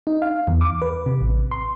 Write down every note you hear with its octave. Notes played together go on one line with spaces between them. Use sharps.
D#4
F5
E2
D6
B4
C3
A1
C6